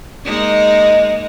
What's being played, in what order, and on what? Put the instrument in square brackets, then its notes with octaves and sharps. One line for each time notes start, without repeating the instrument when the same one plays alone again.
[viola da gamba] G#3 A#3 D#4